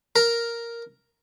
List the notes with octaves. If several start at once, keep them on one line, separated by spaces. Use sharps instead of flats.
A#4